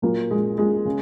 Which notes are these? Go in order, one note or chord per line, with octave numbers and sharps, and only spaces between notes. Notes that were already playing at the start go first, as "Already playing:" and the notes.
A#2 F#3 A#3
A#1 G#3
A#1 G#3
C#3